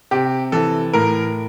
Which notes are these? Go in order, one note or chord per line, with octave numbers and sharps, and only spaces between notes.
C3 G4
E3 A4
A2 A#4